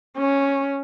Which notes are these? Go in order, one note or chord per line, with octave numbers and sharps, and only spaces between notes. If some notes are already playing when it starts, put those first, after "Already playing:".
C#4